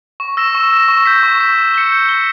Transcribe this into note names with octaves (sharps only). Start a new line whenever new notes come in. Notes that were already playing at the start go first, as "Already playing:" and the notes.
C#6
E6 A#6 E7
C#6
E6 A#6 E7
C#6
G6 B6
C#6
G6 B6
G6
C#7 G7
G6
C#7 G7